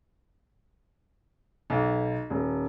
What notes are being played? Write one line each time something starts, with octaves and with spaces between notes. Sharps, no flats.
B1
D#1